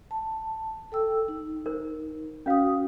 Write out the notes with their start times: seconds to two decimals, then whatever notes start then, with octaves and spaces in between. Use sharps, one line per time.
0.11 A5
0.92 A4 G5 E6
1.28 D#4
1.66 A#4 C5
2.46 C#4 F#4 B4 F5 D#6